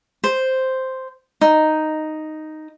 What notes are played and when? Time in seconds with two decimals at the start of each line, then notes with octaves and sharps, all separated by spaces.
0.24 C5
1.41 D#4